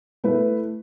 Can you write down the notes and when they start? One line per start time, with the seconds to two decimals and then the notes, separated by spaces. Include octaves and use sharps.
0.24 A3 E4 B4